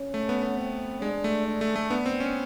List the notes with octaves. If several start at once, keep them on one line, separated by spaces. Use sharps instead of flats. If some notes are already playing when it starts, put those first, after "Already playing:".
Already playing: C#4
A3
B3
B3
C4
G#3 D4
A3
D4
A3
A3
B3 D4
C4
C#4